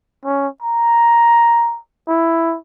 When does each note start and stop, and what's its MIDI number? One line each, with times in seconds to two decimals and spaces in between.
0.25 0.48 61
0.62 1.79 82
2.08 2.57 64